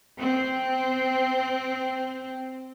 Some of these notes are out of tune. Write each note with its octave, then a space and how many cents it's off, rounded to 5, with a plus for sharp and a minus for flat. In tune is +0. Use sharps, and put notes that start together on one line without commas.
C4 -10